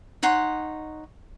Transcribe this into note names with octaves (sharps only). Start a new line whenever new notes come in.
D#4 C#5 F#5 C6